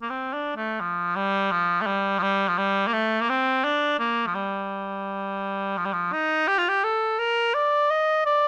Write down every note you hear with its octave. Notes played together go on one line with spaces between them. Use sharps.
A#3
C4
D4
A3
F3
G3
F3
A3
G3
F3
G3
F3
G3
A#3
A3
A#3
C4
D4
A#3
F3
G3
F3
G3
F3
D#4
G4
F4
G4
A4
A#4
D5
D#5
D5